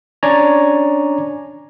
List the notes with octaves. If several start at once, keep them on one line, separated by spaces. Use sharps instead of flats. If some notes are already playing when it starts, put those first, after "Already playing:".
C#4 D4 C#5 D5 G#5 A#5